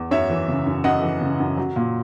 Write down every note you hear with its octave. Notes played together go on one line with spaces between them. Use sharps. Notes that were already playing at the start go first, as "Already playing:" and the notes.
Already playing: E2
F#2 C#5 E5
E3
C#3
F#2
F#2 D#5 F#5
E3
C#3
F#2
F#3
A#2